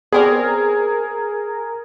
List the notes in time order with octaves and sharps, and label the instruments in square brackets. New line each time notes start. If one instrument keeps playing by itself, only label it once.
[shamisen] B3 C4 D5 [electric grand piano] G#4 [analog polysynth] A#4